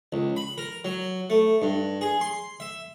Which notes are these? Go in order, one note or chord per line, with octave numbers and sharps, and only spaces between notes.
C#2
B5
A#4
F#3
A3
G2
G#4
C6
E5